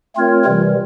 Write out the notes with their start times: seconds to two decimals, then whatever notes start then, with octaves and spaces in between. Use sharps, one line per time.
0.15 A3 C4 F4 A#4 C#5
0.45 C3 E3 G3